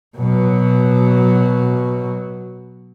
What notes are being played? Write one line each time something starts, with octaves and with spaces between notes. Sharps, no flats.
B2 F#3